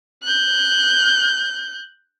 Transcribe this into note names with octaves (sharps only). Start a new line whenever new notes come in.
F#6 G6